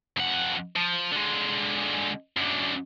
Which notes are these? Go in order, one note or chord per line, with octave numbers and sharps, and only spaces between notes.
F2 F#5
F3
D3 G#3
F#2 D3